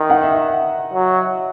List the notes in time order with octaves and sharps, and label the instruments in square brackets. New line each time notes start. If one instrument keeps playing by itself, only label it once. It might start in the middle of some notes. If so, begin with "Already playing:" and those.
Already playing: [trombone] D#3 [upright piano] E5
[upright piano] F#5
E5
D#5
E5
[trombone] F#3